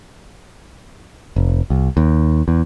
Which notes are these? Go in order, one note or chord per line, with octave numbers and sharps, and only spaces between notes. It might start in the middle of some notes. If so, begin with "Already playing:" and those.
F1
C2
D#2
E2